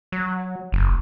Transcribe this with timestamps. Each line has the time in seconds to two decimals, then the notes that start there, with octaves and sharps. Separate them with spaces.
0.12 F#3
0.72 F#1